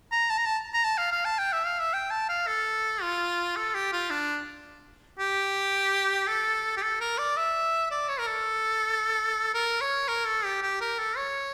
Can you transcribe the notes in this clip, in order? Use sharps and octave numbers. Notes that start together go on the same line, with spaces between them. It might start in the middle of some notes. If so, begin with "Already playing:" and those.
A#5
A5
A#5
A5
A#5
A5
F5
F5
A5
G5
E5
F5
E5
G5
A5
F5
A4
F4
A4
G4
F4
D4
G4
A4
G4
A4
A#4
D5
E5
D5
C#5
A#4
A4
A#4
C#5
A#4
A4
G4
G4
A#4
A4
C#5